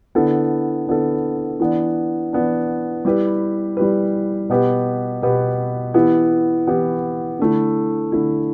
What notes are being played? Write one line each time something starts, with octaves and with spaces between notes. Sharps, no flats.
D3 B3 E4 A4
D3 B3 E4 A4
E3 B3 D4
E3 B3 D4
G3 E4 G4 B4
G3 E4 G4 B4
B2 B3 G4 B4
B2 B3 G4 B4
E3 B3 E4 G4
E3 B3 E4 G4
D3 A3 E4
D3 A3 E4